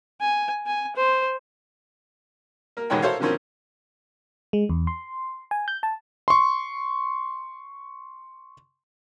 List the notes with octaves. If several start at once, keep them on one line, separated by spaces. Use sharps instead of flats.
G#5
G#5
C5
A#3 A#4
A1 B2 D#3 G#3 C#5 G5
E4 A4 A#4 C5 C#5 F5
D3 D#3 F3 A#3 C4 C#4
G#3
E2
C6
G#5
G6
A5
C6 C#6